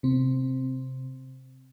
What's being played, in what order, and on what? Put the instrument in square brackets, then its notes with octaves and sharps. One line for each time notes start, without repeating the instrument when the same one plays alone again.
[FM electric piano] C3 C4